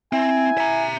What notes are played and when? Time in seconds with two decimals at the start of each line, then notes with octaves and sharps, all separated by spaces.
0.13 C4 E4 G#5
0.58 E5 A#5